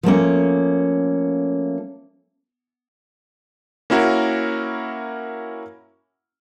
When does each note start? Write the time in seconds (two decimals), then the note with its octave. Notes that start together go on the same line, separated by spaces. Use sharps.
0.03 F3 A3 A#3 C#4
3.90 A#3 C#4 E4 F#4 A#4